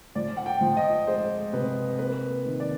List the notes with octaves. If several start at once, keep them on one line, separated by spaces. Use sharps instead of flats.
F3 D5
F#5
G5
F3
D#5
G#3 C5
C3 B4
A#3 B4
D#3
D5